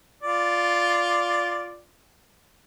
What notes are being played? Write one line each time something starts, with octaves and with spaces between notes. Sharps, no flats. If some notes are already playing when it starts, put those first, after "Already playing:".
F4 D5